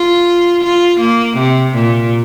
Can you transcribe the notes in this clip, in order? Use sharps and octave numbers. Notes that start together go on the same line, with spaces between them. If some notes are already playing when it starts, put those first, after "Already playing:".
Already playing: F4
F4
A#3
C3
A#2